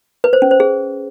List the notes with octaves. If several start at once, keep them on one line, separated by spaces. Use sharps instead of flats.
B4
C5
C#4
C5
G#4